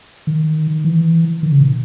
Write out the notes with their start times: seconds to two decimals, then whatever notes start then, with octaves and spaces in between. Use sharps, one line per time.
0.27 D#3
0.84 E3
1.43 D#3
1.52 C#3
1.61 B2